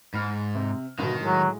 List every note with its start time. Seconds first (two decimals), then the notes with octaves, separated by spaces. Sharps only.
0.14 G#2 B5 F6
0.55 C3
0.99 G1 B2 D#3
1.20 A2 F#3 G#3 F#4